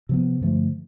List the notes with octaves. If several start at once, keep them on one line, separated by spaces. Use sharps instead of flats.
C3 F3 B3
G2 D3 F3 A3